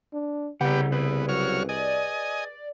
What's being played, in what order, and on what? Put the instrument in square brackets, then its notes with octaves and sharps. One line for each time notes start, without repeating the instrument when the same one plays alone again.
[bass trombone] D4
[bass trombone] C2 [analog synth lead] C#3 [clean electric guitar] G3 F#5 [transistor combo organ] B3 G4
[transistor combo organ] B3 [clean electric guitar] G#4 B4
[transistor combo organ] F#3 C#5 F6
[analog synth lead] D5 [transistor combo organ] D#5 G#5